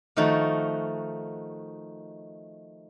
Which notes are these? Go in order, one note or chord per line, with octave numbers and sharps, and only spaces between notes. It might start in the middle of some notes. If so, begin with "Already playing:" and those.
D#3 F3 A3 D#4 F#4